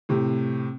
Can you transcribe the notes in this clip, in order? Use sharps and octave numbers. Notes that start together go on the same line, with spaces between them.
A2 C3